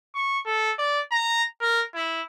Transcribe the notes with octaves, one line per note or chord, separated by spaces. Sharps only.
C#6
A4
D5
A#5
A#4
E4